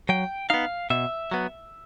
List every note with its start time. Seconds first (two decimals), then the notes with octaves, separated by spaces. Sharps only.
0.09 F#3 G5
0.50 B3 D#4 F5
0.90 B2 E5
1.31 F#3 B3